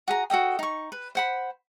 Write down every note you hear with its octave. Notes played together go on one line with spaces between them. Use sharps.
F#4 G#4 A#5
F#4 A4 D#5 G5
D#4 C#6
B4
C5 F#5 B5